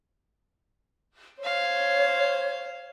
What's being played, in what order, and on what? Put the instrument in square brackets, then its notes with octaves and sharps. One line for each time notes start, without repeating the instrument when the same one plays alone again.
[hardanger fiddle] C5 F5 [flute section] C#5